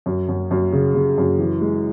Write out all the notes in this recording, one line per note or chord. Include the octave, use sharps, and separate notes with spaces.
F#2
F#2
F#2
C#3
C#3
F#2
E3
G#3